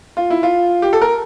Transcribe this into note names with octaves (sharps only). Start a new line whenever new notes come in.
F4
E4
F4
G4
A4
A#4